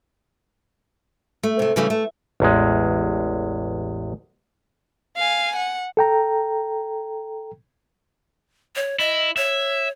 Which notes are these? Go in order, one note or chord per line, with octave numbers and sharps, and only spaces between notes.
A3
C3 A3
C#3 E3 G3 A3 C#4
A3
A1 E2 G#3
F5 G#5
F#5
A4 G5 A#5
C#5
E4 D#5
C#5 E5